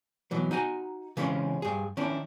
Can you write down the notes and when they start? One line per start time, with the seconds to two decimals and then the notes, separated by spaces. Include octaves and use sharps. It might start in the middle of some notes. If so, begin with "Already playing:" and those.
0.31 B2 E3 F#3
0.51 D#4 F#4 G#5 A#5
1.17 C#3 E3 G#3 C4 C#4
1.62 G2 G#4
1.97 D#3 C#4 D4 E4